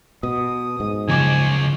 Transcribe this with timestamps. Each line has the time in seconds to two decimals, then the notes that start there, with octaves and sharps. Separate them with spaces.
0.23 B2 D#6
0.80 G#2
1.08 F#1 C#3 F3 D#5 G#5 D6